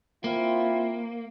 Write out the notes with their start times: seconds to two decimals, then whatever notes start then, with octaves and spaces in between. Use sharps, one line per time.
0.24 A#3 C4 E4 F4